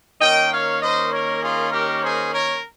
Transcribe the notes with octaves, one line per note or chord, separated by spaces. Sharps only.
D#3 A#3 C#4 D#5 G5
C#5 F5
C5 D#5
A#4 C#5
F4 G#4
G4 A#4
G#4 C5
A#4 C#5